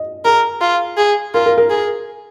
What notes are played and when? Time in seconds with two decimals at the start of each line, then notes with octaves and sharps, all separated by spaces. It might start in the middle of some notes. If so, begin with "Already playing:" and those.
Already playing: D#5
0.25 G#4 A#4
0.61 F4
0.97 G#4
1.34 F4 A#4
1.46 A#4
1.58 A#4
1.70 G#4